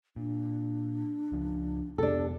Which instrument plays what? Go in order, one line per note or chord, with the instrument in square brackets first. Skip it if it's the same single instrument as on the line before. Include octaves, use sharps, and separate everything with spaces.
[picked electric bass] A#2 [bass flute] D4
[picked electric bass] C#2 F3
[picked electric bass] F2 C3 B3 [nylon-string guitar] D4 A4 [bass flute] G4